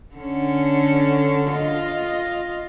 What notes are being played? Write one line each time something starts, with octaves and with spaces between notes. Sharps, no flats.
D3 C#4
F4 D#5